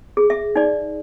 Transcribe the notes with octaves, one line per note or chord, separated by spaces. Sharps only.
G#4
E5
D#4 D5